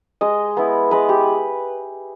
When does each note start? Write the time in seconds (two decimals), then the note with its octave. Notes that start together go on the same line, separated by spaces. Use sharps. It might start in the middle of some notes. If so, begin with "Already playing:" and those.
0.21 G#3 D#5
0.57 B3 E4
0.91 G#3 B4
1.09 G4